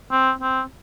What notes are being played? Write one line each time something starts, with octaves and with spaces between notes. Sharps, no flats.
C4
C4